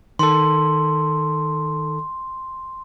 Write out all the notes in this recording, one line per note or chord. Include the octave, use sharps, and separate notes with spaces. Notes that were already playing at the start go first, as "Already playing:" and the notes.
D#3 A4 C6